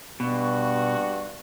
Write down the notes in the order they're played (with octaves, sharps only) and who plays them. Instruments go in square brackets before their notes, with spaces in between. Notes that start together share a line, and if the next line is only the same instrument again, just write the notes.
[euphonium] G2 [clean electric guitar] B2 [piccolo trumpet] F#4